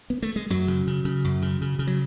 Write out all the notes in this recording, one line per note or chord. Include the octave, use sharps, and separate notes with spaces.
B3
A3
G#3
F#2 F#3
C#3
C#3
C#3
F#2
C#3
C#3
C#3
F#3